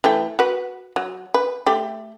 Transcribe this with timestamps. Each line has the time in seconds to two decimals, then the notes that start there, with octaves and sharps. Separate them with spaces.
0.04 E3 A3 G5
0.39 F#4 B4
0.96 F#3
1.34 B4
1.66 A3 G4